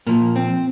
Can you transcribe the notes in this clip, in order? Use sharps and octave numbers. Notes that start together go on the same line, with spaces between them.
A#2 F3 A#3
C4